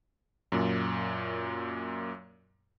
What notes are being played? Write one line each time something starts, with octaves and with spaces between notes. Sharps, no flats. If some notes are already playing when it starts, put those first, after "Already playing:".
F#2 A#2